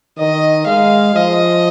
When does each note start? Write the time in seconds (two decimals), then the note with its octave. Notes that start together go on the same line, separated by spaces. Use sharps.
0.18 D#3 D#5
0.66 G#3 F5
1.15 F3 D#5